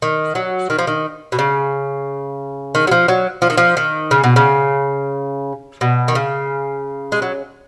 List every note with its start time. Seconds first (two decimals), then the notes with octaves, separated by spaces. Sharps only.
0.02 D#3
0.35 F#3
0.70 D#3
0.78 F3
0.87 D#3
1.32 B2
1.39 C#3
2.75 D#3
2.87 F#3
2.91 F3
3.08 F#3
3.42 F3
3.50 D#3
3.57 F3
3.77 D#3
4.11 C#3
4.24 B2
4.36 C#3
5.81 B2
6.08 D#3
6.15 C#3
7.12 G#3
7.22 F#3